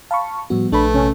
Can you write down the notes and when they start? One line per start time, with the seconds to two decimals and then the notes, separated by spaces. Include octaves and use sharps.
0.11 F5 A5 B5 C#6
0.50 A2 F3 G3 B3 F#4
0.72 A#1 A3 D4 B4 B5
0.94 C3 C#4